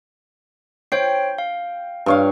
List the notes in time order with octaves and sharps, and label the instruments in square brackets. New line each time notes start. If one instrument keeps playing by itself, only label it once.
[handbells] C5 C#5 C7 [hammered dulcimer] G5
[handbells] F5
[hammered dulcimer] G2 C#5 F5